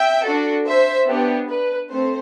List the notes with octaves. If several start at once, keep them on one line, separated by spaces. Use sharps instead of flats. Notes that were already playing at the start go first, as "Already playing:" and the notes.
Already playing: E5 G5
D4 F#4 A4
C5 E5
B3 D4 G4
B4
A3 C4 C5